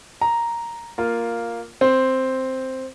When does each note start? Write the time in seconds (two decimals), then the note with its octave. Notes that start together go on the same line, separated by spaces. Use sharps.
0.21 A#5
0.98 A#3 F4
1.81 C4 C5